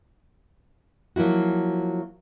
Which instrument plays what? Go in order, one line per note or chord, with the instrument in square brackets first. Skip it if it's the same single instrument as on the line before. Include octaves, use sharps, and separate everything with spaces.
[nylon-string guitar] F3 F#3 A#3 E4 F#4